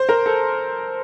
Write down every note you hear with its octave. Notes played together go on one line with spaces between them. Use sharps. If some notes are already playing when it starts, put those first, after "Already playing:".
Already playing: C5
A#4
A4